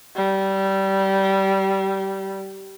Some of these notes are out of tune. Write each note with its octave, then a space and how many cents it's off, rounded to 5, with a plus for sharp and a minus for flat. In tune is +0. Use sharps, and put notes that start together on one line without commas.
G3 -20